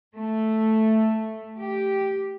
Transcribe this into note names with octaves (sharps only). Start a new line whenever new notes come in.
A3
G4